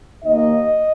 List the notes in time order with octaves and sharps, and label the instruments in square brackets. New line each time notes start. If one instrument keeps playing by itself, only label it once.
[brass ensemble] D#2 D#3 A#3 D#5